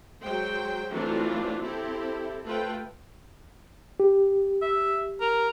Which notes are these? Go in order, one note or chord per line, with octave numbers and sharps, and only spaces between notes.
F#3 G#3 C5 G5
E3 F#3 A3 C4 D4 F4
C4 E4 G4 A4
A3 F4 A4 B4 C5 G5
G4
E5
A#4